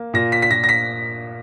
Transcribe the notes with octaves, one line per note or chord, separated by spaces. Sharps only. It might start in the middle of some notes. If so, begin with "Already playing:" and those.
Already playing: A#3
A#2 A#6
B6
B6
A#2 A#6
A#6
B6